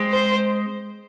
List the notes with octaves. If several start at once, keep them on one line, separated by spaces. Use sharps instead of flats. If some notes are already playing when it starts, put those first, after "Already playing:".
Already playing: G#3 C4
C5